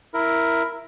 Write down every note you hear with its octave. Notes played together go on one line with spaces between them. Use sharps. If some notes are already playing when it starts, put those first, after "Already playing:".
E4 A#4